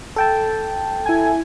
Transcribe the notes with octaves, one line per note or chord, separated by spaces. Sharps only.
A4 G5 A5
E4 G#5